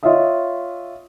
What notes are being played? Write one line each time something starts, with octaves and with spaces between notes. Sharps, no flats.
F4 C#5 D#5 E5 D#6